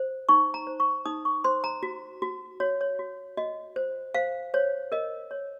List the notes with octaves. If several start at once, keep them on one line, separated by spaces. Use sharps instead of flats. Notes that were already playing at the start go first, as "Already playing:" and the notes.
Already playing: C5
D#4 C#6
A#5
C5
C#6
D#4 D#6
C#6
C5 C6
A#5
F#4
F#4
F#4 C#5
C#5
F#4
F#4 D#5
C5
C5 F5
C5 C#5
A#4 D#5
C#5